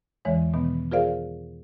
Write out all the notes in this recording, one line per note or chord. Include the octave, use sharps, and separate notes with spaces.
E2 D3 E3 G#3 C#5
B2 D#3 B3
F4 G#4 A#4 C5 D5 F5